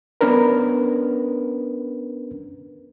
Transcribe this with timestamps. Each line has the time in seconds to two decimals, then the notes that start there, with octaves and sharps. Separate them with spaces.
0.21 B3 C#4 D4 A#4 B4